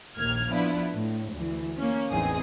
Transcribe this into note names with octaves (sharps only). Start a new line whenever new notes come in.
A#1 D#2 A#3 F6 G#6
F3 B3 D4 E4 F4
A2
D2 E3
A#3 C#4
A1 E2 C4 D#4 G#4 D#6